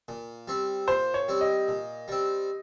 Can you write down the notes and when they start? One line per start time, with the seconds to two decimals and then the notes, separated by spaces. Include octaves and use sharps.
0.08 A#2
0.48 G3 C4
0.88 A#2 C5
1.14 C#5
1.28 G3 C4
1.41 D#5
1.68 A#2
2.08 G3 C4